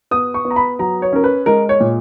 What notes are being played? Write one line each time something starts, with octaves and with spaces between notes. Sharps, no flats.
B3 D#6
C#6
B3
A#5
B5
F#3 A#5
C#5
C#4 A#4
B4
G#3 A#4
C#5
A#2